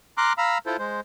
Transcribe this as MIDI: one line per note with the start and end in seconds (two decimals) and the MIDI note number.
0.18 0.33 82
0.18 0.33 84
0.18 0.33 86
0.18 0.33 89
0.18 0.33 90
0.38 0.58 77
0.38 0.58 82
0.38 0.58 83
0.38 0.58 88
0.66 0.77 64
0.66 0.77 65
0.66 0.77 69
0.66 0.77 72
0.79 1.01 56
0.79 1.01 72